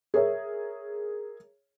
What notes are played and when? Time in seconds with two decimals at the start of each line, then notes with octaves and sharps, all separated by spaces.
0.14 G#4 A#4 C#5 E5